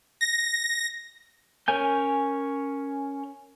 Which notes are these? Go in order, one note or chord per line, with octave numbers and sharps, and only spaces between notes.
A#6
C#4 A#4 C#5 G#5 G6